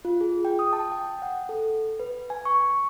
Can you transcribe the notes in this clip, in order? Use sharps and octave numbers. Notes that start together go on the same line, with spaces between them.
F4
G#4
G5
D#6
A5
G5
F#5
A4
B4
G#5
C#6